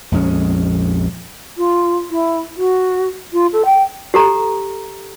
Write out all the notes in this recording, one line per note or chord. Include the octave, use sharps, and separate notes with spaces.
A#1 F2 G#3 C#4
F4
E4
F#4
F4
A4
G5
G4 A4 A#5